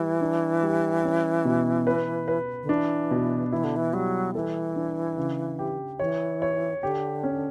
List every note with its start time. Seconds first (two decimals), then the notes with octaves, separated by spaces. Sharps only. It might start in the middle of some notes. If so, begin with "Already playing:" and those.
Already playing: E3 G3
0.21 D4
0.63 G3
1.04 C#4
1.45 B2
1.87 B4
2.28 B4
2.63 D3
2.69 E3 D4
3.11 B2
3.52 E3 E4
3.64 D3
3.76 E3
3.93 F#3 G3
4.35 E3 A4
4.76 D4
5.17 C#3
5.59 G4
6.00 E3 C#5
6.42 C#5
6.83 D3 G4
7.23 C#4